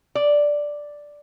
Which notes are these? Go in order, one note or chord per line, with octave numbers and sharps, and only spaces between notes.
D5